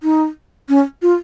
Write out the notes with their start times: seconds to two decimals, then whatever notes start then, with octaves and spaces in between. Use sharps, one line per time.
0.03 D#4
0.69 C#4
1.02 F4